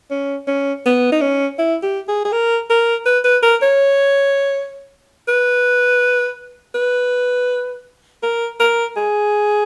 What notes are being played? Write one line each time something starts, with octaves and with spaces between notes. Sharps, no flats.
C#4
C#4
B3
D#4
C#4
E4
G4
G#4
G#4
A#4
A#4
B4
B4
A#4
C#5
B4
B4
A#4
A#4
G#4